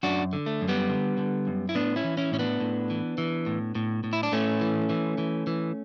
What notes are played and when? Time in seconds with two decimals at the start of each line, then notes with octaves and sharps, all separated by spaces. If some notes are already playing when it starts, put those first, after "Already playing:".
0.03 F#2 D4 F#4
0.33 D3
0.46 A3
0.61 F#2
0.68 G3 B3
0.89 D3
1.18 D3
1.47 F#2
1.69 E4
1.75 A2 B3 D4
1.96 C#4 E4
2.04 E3
2.17 C#4 E4
2.32 A2 C#4
2.39 B3 D4
2.60 A2
2.90 E3
3.18 E3
3.46 A2
3.75 A2
4.04 A2
4.13 E4
4.23 D4
4.32 A2 A3 C#4
4.61 E3
4.90 E3
5.18 E3
5.47 E3